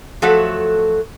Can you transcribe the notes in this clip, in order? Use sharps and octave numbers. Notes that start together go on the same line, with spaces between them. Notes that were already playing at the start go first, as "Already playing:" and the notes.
F3 F#3 A3 F#4 A4 F#5